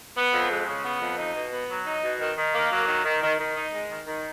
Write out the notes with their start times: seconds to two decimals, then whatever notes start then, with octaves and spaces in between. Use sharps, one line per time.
0.17 B3
0.33 F2
0.50 G#3
0.67 C#3
0.84 B3
1.01 F2
1.18 D#4
1.35 B2
1.52 B3
1.69 F#3
1.86 D#4
2.03 B2
2.20 D#3
2.38 D#3
2.54 A#3
2.71 F#3
2.88 D#3
3.04 D#3
3.23 D#3
3.39 D#3
3.56 D#4
3.73 G#3
3.90 D#3
4.07 D#3